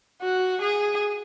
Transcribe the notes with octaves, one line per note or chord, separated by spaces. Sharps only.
F#4
G#4